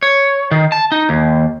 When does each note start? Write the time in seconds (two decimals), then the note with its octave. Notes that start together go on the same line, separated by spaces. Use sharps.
0.03 C#5
0.51 D#3
0.72 A5
0.92 D#4
1.09 D#2